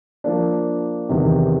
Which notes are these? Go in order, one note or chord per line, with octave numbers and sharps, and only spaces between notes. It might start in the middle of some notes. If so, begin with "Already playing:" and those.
F3 A#3 D4
E2 C3 D#3